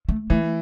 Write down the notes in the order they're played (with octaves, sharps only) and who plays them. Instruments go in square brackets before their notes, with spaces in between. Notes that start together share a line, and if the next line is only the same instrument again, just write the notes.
[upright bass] A3
[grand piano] E3 [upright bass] A3